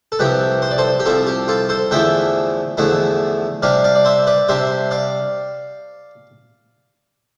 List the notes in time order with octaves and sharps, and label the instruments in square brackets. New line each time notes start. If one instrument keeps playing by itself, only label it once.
[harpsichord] A4
C2 C3 F3 G4 B4
C5
D5
A4 C5
G4
C2 C3 F3 F4 A4
G4
F4 A4
A4 C5
E2 D3 F3 A3 E4 E5 G5
E2 D3 F3 A3 E4
C3 G3 D4 D5 F5
D5 F5
D5
C5 E5
B4 D5
C3 G3 D4 C5 E5
D5 F5